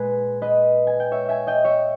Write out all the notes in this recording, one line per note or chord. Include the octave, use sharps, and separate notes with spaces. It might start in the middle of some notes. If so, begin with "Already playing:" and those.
Already playing: A#2 G#3 G#4 B4
B4 D#5
G#5
G5
C#5 E5
E5 G#5
D#5 G5
C#5 E5